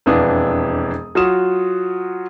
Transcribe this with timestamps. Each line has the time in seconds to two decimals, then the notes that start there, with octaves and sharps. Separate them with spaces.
0.06 E1 F2 E3 D4 F5 D#6
1.15 F#3 F4 F#4 D#6 E7